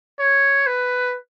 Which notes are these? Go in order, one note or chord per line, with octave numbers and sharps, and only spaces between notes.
C#5
B4